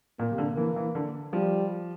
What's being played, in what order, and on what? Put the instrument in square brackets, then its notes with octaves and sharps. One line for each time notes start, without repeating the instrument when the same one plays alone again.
[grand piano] A#2 [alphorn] A#3
[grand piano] C3
D3
[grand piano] E3 [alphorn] A#3
[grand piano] E3
D3
[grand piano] F3 [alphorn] G3